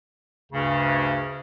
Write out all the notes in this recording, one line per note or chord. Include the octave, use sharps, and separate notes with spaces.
D2 G2 C#3